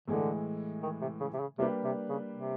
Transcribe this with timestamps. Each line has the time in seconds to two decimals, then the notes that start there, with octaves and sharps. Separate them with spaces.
0.08 A2 D3 E3 G#3
0.83 D#3
1.02 C3
1.20 C#3
1.33 C3
1.40 C#3
1.58 C3 G3 A#3 D4 G4 B4
1.84 C3
2.09 C#3
2.34 C3